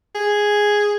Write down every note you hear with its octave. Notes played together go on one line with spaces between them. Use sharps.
G#4